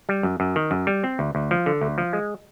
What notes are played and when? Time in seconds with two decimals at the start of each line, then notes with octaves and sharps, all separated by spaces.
0.09 G3
0.23 F#2
0.40 F#2
0.56 D#3
0.71 F#2
0.87 G3
1.04 C4
1.19 D2
1.35 D2
1.51 F3
1.66 D3
1.81 D2
1.98 F3
2.13 G#3